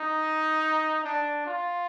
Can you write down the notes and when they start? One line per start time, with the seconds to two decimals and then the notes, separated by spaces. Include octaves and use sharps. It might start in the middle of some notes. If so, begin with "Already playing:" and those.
Already playing: D#4
1.04 D4
1.46 F4